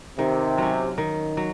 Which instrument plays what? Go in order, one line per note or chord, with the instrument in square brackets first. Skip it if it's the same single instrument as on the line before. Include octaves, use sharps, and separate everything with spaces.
[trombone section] C3 [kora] D#3
[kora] F#3 C#4
D#3
F#3